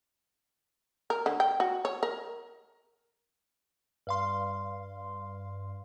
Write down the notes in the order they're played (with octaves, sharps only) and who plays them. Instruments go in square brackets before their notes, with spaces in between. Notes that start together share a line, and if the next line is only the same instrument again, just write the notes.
[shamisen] A#4
D3
G5
F#4
C#5
A#4
[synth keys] G2 F5 C6